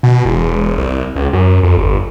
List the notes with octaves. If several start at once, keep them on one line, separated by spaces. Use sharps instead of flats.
B2
E1
C2
C#2
F#2
F2
G1